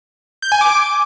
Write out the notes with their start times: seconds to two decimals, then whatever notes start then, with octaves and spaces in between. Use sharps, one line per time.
0.42 G6
0.52 G#5
0.61 D6